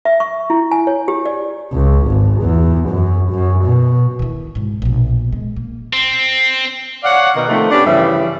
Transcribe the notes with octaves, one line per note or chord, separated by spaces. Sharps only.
E5
C#6
E4
G#5
C#5
G4
D5
C#2
G#1
E2
F#2
F#2
B2
D#3 E4
C2 G#2
A#1 B2
G#3
A#3
C4
C#5 D5 F5 F#5
B2 D#3 A#4
C3 D#3 F3 A3
B3 C#4 D4 G4
G2 C#3 E3 F3 G3 E5